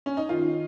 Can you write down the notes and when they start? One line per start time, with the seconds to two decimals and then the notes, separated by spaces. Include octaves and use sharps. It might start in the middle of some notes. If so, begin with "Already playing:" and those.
0.06 C#4
0.17 D#4
0.29 D#3 F4